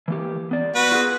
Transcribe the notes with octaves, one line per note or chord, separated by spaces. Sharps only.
E3 A#3 G4
B3 D5
F#4 B4
F4 G#4